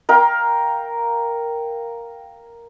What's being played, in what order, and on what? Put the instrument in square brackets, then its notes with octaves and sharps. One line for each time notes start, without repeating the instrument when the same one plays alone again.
[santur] A#4 F5 G5